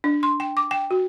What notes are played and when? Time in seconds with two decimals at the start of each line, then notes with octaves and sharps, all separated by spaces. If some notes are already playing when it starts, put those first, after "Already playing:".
0.04 D4
0.23 C6
0.40 G5
0.57 D6
0.71 G5
0.91 F#4